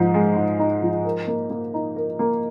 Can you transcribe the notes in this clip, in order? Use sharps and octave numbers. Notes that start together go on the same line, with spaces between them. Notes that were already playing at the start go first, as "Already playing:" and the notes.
Already playing: G#2 F3 D#4
G#3
G#2
D#4
F3
A#4
A#3
A#3
D#4
A#4
A#3